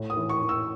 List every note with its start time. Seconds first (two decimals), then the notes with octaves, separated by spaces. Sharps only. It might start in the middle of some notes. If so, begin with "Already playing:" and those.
Already playing: A2
0.10 D#6
0.17 E3
0.29 C#6
0.42 E3
0.49 E6